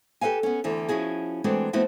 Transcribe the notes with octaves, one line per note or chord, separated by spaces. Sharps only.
G4 A4 B4 F5 G#5
B3 C#4
D2 D3 E3
F3 C#4 E4 F#4 G#4
E3 G#3 A3 C4 D4 F#4
F3 A3 B3 C4 E4 F#4